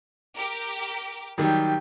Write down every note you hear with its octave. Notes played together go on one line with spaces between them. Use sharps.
G4 A#4 D6
D#3 F#3 G3 G4